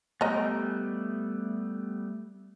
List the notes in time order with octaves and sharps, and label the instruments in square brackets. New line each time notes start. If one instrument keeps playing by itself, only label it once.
[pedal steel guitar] G3 A3 B3 [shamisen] D#5 A#5